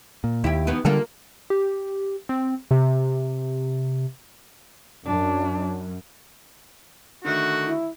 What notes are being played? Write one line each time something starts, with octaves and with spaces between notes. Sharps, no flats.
A#2
D#2 E4 G4
D#3 E3 B3
D3 G3 A#3 F4 A4
G4
C4
C3
F#2 D4
D3 D#3 A3 F#4
E4